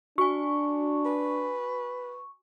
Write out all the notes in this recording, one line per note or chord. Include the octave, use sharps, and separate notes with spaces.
D4 F#4 G#5 C#6
B4